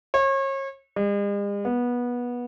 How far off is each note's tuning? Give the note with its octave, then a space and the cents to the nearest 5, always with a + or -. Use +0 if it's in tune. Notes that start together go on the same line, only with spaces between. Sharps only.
C#5 -35
G#3 -45
B3 -20